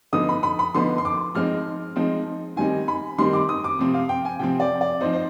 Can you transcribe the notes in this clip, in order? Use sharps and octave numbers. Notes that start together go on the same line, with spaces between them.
D3 F3 B3 D#4 D#6
B5
B5
B5
D3 F3 B3 D#4 C6
C6
D6
F3 G#3 C4 D#4 F6
F3 G#3 C4 D#4
D#3 G3 C4 D#4 G#5
B5
D#3 G3 C4 D#4 C6
D6
D#6
D6
C3 F3 C4
F5
G5
G#5
C3 F3 C4 G5
D5
D5
F3 C4 D#4 C5
C5